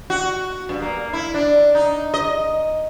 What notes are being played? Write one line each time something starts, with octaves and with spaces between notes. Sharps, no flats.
F#4
G2
A#3
E4
D4
D#4
D#5